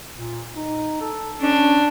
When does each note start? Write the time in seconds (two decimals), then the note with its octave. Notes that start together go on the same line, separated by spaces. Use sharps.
0.18 A#2
0.55 D#4
1.01 A4
1.41 C#4 D4